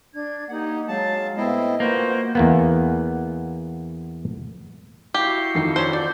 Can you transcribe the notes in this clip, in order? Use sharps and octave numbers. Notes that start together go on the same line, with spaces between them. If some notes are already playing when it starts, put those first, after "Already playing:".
D4 G#6
A#3 D#4 G4 F#5
F#3 G#3 F5 A5
A2 B3 C4 E4 D#5
A#3 C4 F4 F#4 B4 C5 G5
E2 A#3 B3
E4 F#4 G4 F5
F2 D#3 C7
C#4 D4 C5
D5 C6 G6